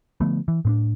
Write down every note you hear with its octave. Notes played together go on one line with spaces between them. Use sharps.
D3 F3 A3 B3
E3
A2 C4 D4